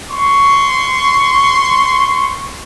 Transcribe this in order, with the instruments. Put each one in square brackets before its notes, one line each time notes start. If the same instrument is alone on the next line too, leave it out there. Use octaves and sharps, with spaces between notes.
[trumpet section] C6 C#6